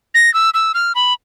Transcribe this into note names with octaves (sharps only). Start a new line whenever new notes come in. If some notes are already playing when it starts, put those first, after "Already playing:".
A#6
E6
E6
F6
B5